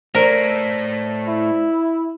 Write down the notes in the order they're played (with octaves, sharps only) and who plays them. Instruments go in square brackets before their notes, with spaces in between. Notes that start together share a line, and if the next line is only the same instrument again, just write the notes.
[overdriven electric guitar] A2 [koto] A#4 [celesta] C5 D5
[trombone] E4